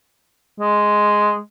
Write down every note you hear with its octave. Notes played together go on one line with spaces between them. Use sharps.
G#3